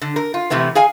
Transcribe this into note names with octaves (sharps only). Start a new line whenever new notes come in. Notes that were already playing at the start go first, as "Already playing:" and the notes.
D3
A#4
F4
C3 E3 A3 B3
G#4 F5 G#5